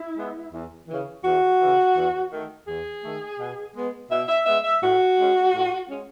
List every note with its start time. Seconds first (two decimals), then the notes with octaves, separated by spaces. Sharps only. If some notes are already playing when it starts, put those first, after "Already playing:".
Already playing: E4
0.17 G#3 B3
0.52 E2
0.88 C#3 E3
1.24 E2 F#4
1.59 E3
1.64 C#3
1.95 E2
2.32 D#3 A3
2.67 E2 G#4
3.02 D#3 A3
3.38 B2
3.75 G#3 B3
4.09 B2 E5
4.28 E5
4.46 G#3 B3 E5
4.64 E5
4.81 A2 F#4
5.18 G#3 C#4
5.53 A2
5.90 G#3 C#4